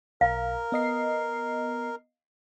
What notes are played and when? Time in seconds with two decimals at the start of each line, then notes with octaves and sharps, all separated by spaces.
0.21 B1 A#4 F5 A#5
0.72 B3 D#5 C7